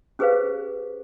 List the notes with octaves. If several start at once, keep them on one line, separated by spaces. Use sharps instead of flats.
C#4 G4 G#4 B4 C5 F5